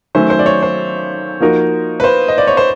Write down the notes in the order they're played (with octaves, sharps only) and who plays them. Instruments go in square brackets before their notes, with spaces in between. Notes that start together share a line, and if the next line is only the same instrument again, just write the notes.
[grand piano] D#3 F#3 A3 C#4 [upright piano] C5
[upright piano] C5
D5
C#5
C5
[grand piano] F3 A#3 D#4 F#4 A#4
[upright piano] B4
C5
D#5
D5
C#5
C5